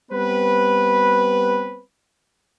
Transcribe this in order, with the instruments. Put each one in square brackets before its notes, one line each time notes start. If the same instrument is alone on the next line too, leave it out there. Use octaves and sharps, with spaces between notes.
[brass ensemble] G3 B3 C4 B4